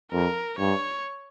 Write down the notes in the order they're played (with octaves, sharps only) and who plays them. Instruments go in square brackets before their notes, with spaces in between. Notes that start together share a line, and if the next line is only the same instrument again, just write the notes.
[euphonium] F2 [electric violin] A#4
[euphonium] G2 [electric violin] C#5